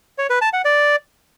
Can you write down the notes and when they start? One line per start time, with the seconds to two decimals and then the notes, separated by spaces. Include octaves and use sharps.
0.18 C#5
0.30 B4
0.41 A5
0.53 F#5
0.65 D5